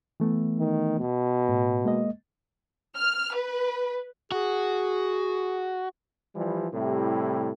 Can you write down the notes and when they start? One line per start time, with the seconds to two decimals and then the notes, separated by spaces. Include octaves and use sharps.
0.20 E3 A3 B3
0.59 D#3
0.99 B2
1.49 A2
1.85 G#3 A#3 D#5
2.97 F6
3.34 B4
4.32 F#4 G#4
6.35 E3 F3 G3
6.73 A2 C3 G3 E4 G4